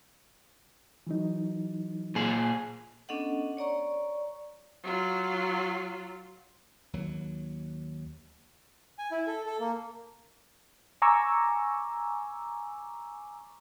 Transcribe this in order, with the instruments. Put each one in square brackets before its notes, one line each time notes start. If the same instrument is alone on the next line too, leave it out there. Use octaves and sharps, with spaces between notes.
[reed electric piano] E3 F#3 D#4
[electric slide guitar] A#2 G#4
[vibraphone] B3 C#4 D4 A4 D#5 F#5
C#5 D5 A#5 C#6
[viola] F#3 F4
[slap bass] D#2 F#3
[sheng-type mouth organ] G#5
E4
A4
A4
A#3
[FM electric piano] G#5 A#5 C#6 D6 E6